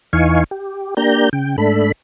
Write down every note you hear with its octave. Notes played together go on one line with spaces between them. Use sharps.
E2 E3 D#4 F5 G#5 C#6
G4
A#3 D4 G4 A#5 G6
C#3 G5
G#2 A3 D4 A4 B5